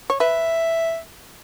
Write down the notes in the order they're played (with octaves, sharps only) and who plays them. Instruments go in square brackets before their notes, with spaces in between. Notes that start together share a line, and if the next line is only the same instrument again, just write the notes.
[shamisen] C#5
[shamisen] B4 [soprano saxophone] E5